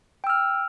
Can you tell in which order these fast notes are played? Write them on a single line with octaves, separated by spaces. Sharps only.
G5 E6 F6